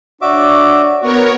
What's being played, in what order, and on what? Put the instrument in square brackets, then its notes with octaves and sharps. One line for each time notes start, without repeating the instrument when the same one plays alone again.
[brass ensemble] D4 C#5 D5 [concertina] F#4 E5 D6
[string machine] B3 A#4 C#5 [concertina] F#4